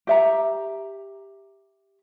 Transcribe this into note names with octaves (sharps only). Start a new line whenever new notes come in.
G4 E5 A#5